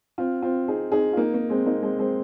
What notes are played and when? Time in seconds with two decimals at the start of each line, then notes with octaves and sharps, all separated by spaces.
0.18 C4 F4
0.42 C4 F4
0.68 D#4 G#4
0.92 D#4 G#4
1.13 F4
1.17 A#3 D#4
1.34 A#3
1.49 G#3 C4
1.66 A#3 D#4
1.82 G#3 C4
1.99 G#3 C4